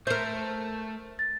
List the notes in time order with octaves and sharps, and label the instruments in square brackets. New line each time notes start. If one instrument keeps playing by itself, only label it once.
[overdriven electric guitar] A3 [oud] A#4 C5 [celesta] G6
[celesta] A6